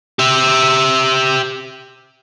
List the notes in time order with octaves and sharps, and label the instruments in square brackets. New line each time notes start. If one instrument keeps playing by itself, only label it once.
[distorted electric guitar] G4 E5